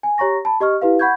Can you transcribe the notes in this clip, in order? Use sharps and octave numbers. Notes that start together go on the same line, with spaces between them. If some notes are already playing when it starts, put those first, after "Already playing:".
G#5
G4 C#5 A#5 C#6 A#6
A5 B5
G4 D#5 C#6 F6
E4 G4 B4 F5
F#5 B5 C#6 G6 G#6